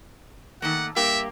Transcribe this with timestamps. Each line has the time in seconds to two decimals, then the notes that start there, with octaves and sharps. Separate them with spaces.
0.62 D#3 A3 A#3 F#5
0.96 G2 A#3 G4 E5